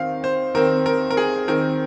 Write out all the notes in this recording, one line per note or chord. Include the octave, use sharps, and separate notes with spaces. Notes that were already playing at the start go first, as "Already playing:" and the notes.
Already playing: D#3 C4 F5
C5
D#3 C4 A#4
A#4
A#4
G#4
D#3 C4 A#4